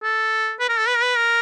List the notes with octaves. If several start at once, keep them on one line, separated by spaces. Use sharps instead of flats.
A4
B4
A#4
A4
B4
A#4
B4
A#4